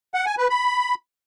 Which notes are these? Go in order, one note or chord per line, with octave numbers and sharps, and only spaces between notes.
F#5
G#5
B4
B5